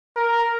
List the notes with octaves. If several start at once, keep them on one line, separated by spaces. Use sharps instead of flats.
A#4